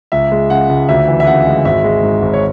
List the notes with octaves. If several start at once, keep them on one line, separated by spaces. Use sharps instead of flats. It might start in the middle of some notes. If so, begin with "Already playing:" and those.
C#2 E5
G#3
C#3 F#5
C#2
D2 E5
E3
E5
C#3 F#5
G#3
G#1 E5
G#3
G#2
G#1
C#5